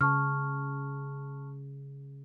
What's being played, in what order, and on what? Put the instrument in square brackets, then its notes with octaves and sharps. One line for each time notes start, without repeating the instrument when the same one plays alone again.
[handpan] C#3 [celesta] A5 C#6 F6